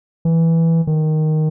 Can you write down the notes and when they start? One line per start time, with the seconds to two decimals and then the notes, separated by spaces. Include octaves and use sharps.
0.25 E3
0.87 D#3